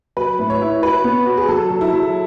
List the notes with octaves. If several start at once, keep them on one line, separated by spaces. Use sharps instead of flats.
F#3 B4
A2
C#5
E4
F#4 B4
B3
F#4
G#4
F#3 A4
F#3
E4
F#3